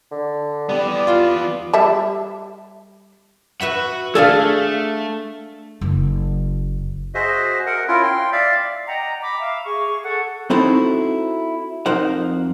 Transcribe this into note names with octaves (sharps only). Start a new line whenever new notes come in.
D3
E3 G3 B3 D5
F4
G3 E5 A5
F#4 B4 E5 F#5 B5
A3 D4 G#4 A4 D5 F5
F#1
F#4 G#4 C5 D#5 E5
A#4 F#5
C#4 E4 F4 A#4
G5 C6
D5 E5 F5
D#5 F#5 G5 A#5
B5 D6
E5 F5
G#4 C#6
G#4 A4 F#5
C4 D#4 E4 F#4 A4 C5
F2 D#4 A#4 C5 F#5